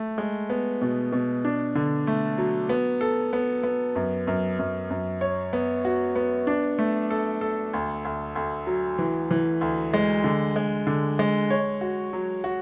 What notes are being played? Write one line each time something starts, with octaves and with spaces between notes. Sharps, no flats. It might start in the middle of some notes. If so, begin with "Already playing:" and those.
Already playing: A3
G#3
B3
B2
B2
D4
D3
A3
F#3
B3
A4
B3
B3
F#2
F#2
F#2
F#2
C#5
B3
F#4
B3
D4
A3
A4
A4
D2
D2
D2
F#3
E3
E3
D2
G#3
D3
G#3
D3
G#3
C#5
F#4
F#3
F#4